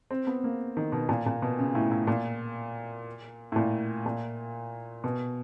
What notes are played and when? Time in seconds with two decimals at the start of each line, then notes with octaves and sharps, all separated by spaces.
0.11 C4
0.27 B3
0.44 A#3
0.77 D#3
0.92 B2
1.09 A#2
1.26 A#2
1.42 B2
1.59 C#3
1.75 A2
1.91 A2
2.07 A#2
3.52 A2
3.56 A#2
4.06 A#2
5.04 B2